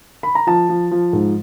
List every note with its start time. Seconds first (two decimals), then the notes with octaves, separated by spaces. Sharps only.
0.23 B5
0.35 A#5
0.47 F3 A5
0.69 F3
0.91 F3
1.13 G#2